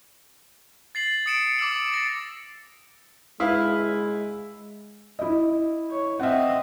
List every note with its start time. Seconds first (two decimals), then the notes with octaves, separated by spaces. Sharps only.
0.95 A6 C7 F#7
1.26 D#6 A6 C#7 D7 E7
1.59 D6 E6 F#7
1.92 A6 A#6
3.40 G#3 E4 B4 F5
5.19 E4 D#5
5.90 C#5
6.20 C4 D#5 E5 F#5